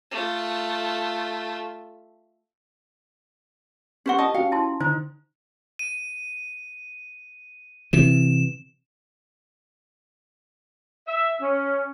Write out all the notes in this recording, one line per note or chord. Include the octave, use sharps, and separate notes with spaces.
A3 F4
C#4 G4 C5 F#5 C#6
F4 D#5 A5 D#6
C#4 F#4 F5 G5
E4 A5 C6
D3 D#4 C5
D#7
C3 E3 E7
E5
C#4